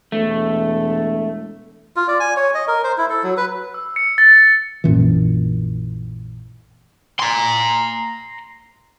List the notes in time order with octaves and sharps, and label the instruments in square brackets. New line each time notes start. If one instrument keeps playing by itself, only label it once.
[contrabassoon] E1 [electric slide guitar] A3
[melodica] F4
D5
G#5
C#5
D#5
A#4
C5
E4
A4
F#3
B4
[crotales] E6
C#7
A6
[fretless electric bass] A#1 F#2 A#2 E3
[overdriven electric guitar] A#5 C6